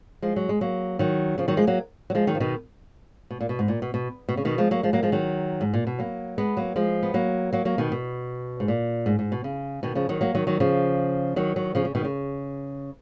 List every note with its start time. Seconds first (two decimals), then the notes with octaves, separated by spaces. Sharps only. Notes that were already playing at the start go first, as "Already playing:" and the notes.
0.22 F3 G#3
0.36 F#3
0.49 G#3
0.61 F#3 A#3
0.99 D#3 F#3
1.38 C#3 F3
1.48 D#3 F#3
1.57 F3 G#3
1.67 F#3 A#3
2.10 F#3
2.15 F3 G#3
2.27 D#3 F#3
2.35 F3
2.40 B2 D#3
3.30 B2
3.40 A#2
3.49 B2
3.59 G#2
3.68 A#2
3.82 B2
3.94 B2
4.28 B2
4.37 C#3
4.45 B2 D#3
4.58 F3 G#3
4.71 F#3 A#3
4.83 F3 G#3
4.93 F#3 A#3
5.03 F3 G#3
5.12 D#3 F#3
5.61 G#2
5.74 A#2
5.87 B2
5.99 F#3 A#3
6.38 G#3 B3
6.57 F#3 A#3
6.76 F3 G#3
7.03 B3
7.14 F#3 A#3
7.53 F#3 A#3
7.65 F#3 A#3
7.78 B2 D#3
7.92 B2
8.60 G#2
8.68 A#2
9.06 G#2
9.19 G#2
9.32 B2
9.44 C#3
9.83 B2 D#3
9.95 C#3 F3
10.09 D#3 F#3
10.21 F#3 A#3
10.35 D#3 F#3
10.47 D#3 F#3
10.60 C#3 F3
11.36 D#3 F#3
11.56 D#3 F#3
11.75 C#3 F3
11.85 C#3
11.95 B2 D#3
12.05 C#3